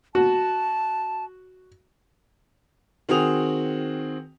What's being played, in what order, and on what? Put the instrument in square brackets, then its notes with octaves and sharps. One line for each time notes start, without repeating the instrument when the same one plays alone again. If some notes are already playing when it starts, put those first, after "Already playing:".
[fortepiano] F#4 [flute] A5
[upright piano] D#3 C4 F#4 G#4 D#6 F7